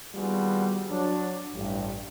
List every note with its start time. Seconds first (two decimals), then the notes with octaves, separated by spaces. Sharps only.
0.15 D#2 G3 B3 F4 F#4 G#4
0.90 F#3 D4
1.54 A1 G2